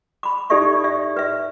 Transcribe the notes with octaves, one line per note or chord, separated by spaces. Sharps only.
B5 D6
D#4 G4 A4 D5 E5 C#6
D5 E5
B4 E5